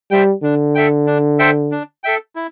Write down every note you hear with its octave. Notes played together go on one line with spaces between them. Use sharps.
G3 C5 E5 G5
D3 D4
A4 E5 G5
D4
A4 C5 E5 G5
D4
A4 E5 G5
E4